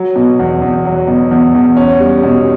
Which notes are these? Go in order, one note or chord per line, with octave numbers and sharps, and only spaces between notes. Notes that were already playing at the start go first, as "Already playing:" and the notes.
Already playing: F#3
B2
E2
E2
F#3
B2
E2
E2
C#4
G3
B2